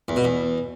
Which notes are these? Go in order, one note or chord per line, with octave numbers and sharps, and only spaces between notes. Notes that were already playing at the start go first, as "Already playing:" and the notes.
E2
B2
E2